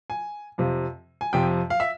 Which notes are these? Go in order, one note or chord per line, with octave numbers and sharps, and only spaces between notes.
G#5
F2 C3 F3
G#5
F2 C3 F3 G5
F5
E5